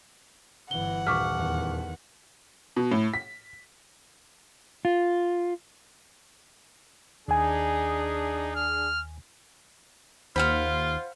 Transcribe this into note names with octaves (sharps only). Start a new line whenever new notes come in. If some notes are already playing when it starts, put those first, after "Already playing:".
G1 E3 F#5 G7
D#1 C#6 D6 F6 B6
E2 D#3
B2
A2
B6
F4
D#2 D4 D#4 G#4 G#5
F6
D#2 F4 C5 F5 F#5 B5